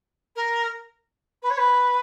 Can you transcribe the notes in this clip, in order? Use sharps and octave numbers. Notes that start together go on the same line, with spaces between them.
A#4
B4
C#5
B4